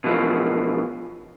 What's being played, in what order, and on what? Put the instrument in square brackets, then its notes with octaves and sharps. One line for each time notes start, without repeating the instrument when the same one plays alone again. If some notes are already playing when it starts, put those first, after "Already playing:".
[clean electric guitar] B2 E3 F3